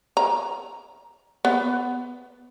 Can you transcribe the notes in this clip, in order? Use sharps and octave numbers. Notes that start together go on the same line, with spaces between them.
A#5
B3